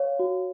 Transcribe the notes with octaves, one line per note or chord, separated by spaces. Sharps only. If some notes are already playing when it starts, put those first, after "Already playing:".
Already playing: C#5 F5
F#4